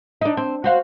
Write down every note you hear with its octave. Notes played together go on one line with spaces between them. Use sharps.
D4 D#4
C4
F#4 C5 F5